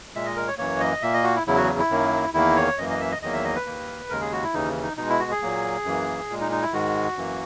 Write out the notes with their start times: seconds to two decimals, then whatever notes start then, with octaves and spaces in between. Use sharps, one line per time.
0.15 A#2 G#3 E5
0.26 D#5
0.37 A#4
0.48 C#5
0.58 F#2 E3 A#3 C#5
0.80 D#5
1.02 A#2 A#3 E5
1.14 D#5
1.24 F#4
1.36 E4
1.47 E2 C#3 F#3 E4
1.57 F#4
1.79 E4
1.90 F#2 D#3 F#3 A#3
2.34 E2 D#3 A#3 E4
2.56 C#5
2.78 F#2 E3 A#3 D#5
2.90 D#5
3.00 E5
3.12 D#5
3.22 E2 D#3 F#3 A#3 D#5
3.33 E5
3.44 D#5
3.55 B4
3.66 D#2 D#3 A#3
4.10 D#2 C#3 G#3 A#4
4.21 G#4
4.32 F#4
4.43 E4
4.54 D#2 C#3 E3 D#4
4.83 D#4
4.97 B2 G#3 D#4
5.09 E4
5.19 F#4
5.31 G#4
5.42 A#2 F#3 A#3
5.85 F#2 E3 A#3
6.30 A#2 G#3
6.41 D#4
6.52 D#4
6.62 E4
6.73 G#2 D#3 G#3 F#4
7.17 F#2 E3 A#3